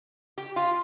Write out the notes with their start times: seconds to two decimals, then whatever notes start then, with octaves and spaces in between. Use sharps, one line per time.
0.38 G4
0.56 F4